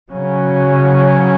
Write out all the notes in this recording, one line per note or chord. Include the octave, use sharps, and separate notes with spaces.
C#3 F#3 C#4